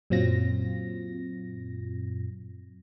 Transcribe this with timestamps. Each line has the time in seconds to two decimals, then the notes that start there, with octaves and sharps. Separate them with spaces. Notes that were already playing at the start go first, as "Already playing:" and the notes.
0.10 F#2 A#2 F#3 C4 F4 A#6